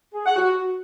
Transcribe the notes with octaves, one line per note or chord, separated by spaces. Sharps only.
G#4
F#5
F#4